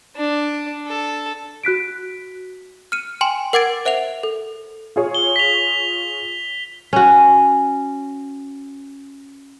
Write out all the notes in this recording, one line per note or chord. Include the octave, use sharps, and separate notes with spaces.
D4
A4
F#4 F#6 B6 D7
F6 C#7 D#7
G5 G#5 C6 E7
A#4 F#5 D6 G#6 A6 D7
C5 E5 F#5 F7
A4
F4 G#4 C#5
G7
B6 F7
C#4 F#4